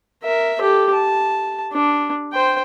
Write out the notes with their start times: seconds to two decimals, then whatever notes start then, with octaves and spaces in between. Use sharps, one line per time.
0.23 A#4 E5
0.60 G4 A4
0.94 A5
1.73 D4
2.33 C5 G5